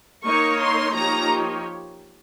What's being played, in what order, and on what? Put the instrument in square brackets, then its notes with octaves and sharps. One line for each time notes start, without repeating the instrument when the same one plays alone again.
[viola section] A#3 D#4 A#4 C#5 [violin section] C#6
[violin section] C6
[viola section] F3 A#3 D#4 G4 C#5 [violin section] A#5